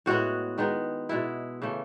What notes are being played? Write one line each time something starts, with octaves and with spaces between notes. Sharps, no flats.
A2 G#3 B3 F#4
D#3 G#3 B3
B2 G#3 B3 E4
C#3 E3 A3